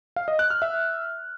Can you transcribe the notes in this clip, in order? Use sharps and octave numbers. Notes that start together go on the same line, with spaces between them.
F5
D#5
F#6
F6
E5